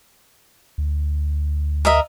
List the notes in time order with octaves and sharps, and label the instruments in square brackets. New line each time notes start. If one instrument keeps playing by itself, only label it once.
[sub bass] D2
[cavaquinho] A#4 D#5 E5